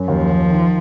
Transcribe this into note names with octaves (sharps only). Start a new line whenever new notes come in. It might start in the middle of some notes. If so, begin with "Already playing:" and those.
Already playing: F#2
D#2 F3
D#2
D#3